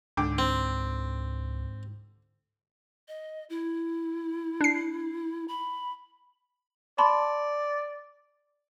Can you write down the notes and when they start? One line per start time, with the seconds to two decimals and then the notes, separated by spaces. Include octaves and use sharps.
0.17 C#2 G#2 D3 G5 D6
0.38 C4
3.08 D#5
3.50 E4
4.61 D4 C7
5.48 B5
6.98 D5 A5 B5 C6